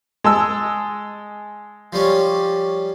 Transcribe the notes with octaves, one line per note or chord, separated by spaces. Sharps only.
G#3 A5 E6
F3 G3 C#4